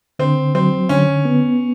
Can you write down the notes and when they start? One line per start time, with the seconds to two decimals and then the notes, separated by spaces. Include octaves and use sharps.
0.19 D3 C4
0.55 F#3 C4
0.89 D3 C#4
1.25 B3